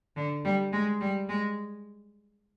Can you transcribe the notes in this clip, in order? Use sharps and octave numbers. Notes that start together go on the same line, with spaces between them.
D3
G3
G#3
G3
G#3